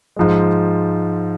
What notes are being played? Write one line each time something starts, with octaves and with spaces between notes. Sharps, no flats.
G#2 F3 G#3